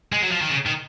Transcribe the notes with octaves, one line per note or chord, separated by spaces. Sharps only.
G#3
F#3
F3
D#3
C#3
D#3